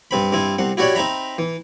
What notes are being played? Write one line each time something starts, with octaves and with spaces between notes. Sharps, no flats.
G2 C4 B5
G2 C4 E4
C2 C3 F#5
E4 F#4 G4 C#5 D5 F#5
C4 D#4 E5 A#5 B5
E3